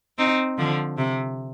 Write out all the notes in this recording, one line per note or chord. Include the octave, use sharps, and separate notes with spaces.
C4 D#4
D3 F3
C3